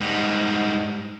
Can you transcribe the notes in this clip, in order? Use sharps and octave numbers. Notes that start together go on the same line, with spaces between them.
G#2 G3